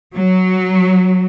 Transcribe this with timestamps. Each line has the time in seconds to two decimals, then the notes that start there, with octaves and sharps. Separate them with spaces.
0.16 F#3